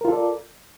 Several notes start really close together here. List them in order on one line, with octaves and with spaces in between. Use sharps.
A#4 F4 A4 D5